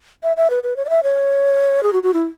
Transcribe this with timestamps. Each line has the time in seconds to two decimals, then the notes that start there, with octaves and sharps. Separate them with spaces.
0.23 E5
0.37 E5
0.50 B4
0.63 B4
0.76 C#5
0.85 D5
0.90 E5
1.03 C#5
1.83 G#4
1.93 F#4
2.03 F#4
2.14 E4